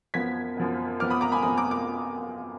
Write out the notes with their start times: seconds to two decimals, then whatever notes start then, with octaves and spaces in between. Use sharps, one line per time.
0.14 F#2 F3 B3 G#6 B6
0.57 F#2 F3 B3
0.99 F#2 F3 B3 D6 F6
1.10 B5 D#6
1.21 A#5 D6
1.32 G#5 B5
1.43 F#2 F3 B3 B5 D#6
1.57 A#5 D6
1.71 D6